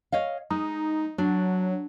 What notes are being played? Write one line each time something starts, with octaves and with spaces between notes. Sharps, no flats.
C#5 D#5 F5
G#3 D#4
F#3 D4